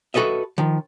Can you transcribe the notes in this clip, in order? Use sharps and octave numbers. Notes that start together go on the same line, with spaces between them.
F#4 A4 B4 D#5 E5
D#3 F3